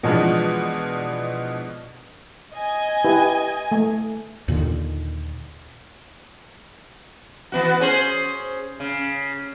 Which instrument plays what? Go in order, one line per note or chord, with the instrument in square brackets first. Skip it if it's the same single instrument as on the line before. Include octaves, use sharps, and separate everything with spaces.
[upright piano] B2 E3 F3 G#3 B3 D4
[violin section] D#5 G#5
[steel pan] E4 G4 B4
A3
[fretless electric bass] D#2 A#2 D3 D#3
[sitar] E3 B3 F#4
C#4 G#4 C5
C#3